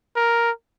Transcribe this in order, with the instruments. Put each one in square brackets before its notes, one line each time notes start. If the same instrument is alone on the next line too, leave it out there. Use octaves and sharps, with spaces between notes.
[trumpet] A#4